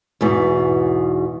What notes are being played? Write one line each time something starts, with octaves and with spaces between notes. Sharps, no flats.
E2 G#2 B2